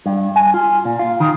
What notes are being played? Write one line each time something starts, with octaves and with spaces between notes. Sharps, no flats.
G2
G#5
F4
A#2
F4
D#3